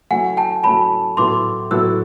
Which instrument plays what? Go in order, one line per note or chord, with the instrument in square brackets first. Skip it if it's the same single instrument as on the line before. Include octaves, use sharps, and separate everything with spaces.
[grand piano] F#3 A3 C#4 E4 [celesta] F#5 G#5
[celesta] G5 A5
[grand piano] F#3 A3 C#4 E4 [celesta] A5 B5
[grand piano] A2 F#3 B3 E4 A4 [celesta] C6 D6
[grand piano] A2 F#3 B3 E4 A4 [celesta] E6 F#6